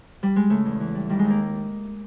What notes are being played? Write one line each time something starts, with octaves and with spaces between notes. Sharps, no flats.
G3
G#3
C#3 A3
E2
E3
G3
D#3 G3
D#2 G#3
A#3